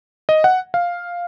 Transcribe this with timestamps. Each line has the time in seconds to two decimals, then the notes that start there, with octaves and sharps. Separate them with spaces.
0.29 D#5
0.44 F#5
0.74 F5